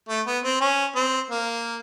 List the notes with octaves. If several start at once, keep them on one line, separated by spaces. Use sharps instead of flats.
A3
B3
C4
C#4
C4
A#3